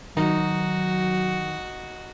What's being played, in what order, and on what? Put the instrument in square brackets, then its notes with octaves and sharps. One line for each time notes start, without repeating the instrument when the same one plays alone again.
[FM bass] D#3 [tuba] F#3 [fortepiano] D#4 [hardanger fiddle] F#4